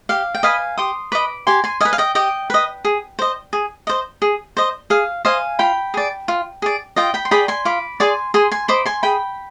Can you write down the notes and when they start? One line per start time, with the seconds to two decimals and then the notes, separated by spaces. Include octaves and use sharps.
0.09 G4 F5
0.35 G5
0.43 B4 D#5 F5 G#5
0.78 G4 C6 D#6
1.12 B4 D#5 B5 D6
1.47 G4 G#5 C6
1.64 G#5 C6
1.81 D#5 F5 G#5
1.85 B4
1.93 F5
1.98 D#5 G5
2.15 G4 D#5 G5
2.50 B4 D#5
2.85 G#4
3.19 C5 D#5
3.53 G#4
3.87 C5 D#5
4.22 G#4
4.57 C5 D#5
4.90 G#4 F5
5.25 C5 D#5 F5 G#5
5.59 F4 G5 B5
5.94 G#4 D5
6.28 F4
6.62 G#4 D5
6.96 F4 D#5 G5
7.14 G5 B5
7.25 C6
7.31 G#4 D5 G5 B5
7.48 G#5 C6
7.65 F4 B5 D6
8.00 G#4 D5 G#5 C6
8.34 G#4 G#5 C6
8.52 G#5 C6
8.68 C5 D#5 B5 D6
8.85 G#5 C6
9.03 G#4 G5 B5